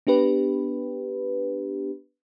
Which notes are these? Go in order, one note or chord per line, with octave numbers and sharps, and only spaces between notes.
B3 D4 G4 B4